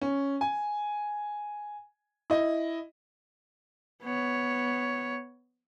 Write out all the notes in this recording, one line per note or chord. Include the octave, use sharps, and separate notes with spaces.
C#4
G#5
E4 D#5
B3 C#5